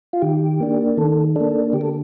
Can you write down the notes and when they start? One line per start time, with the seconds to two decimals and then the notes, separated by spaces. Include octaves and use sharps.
0.13 F4
0.22 D#3 G4
0.60 A#3 D4
0.97 D#3 A4
1.36 A#3 D4 A4
1.73 D3 G4
1.81 A4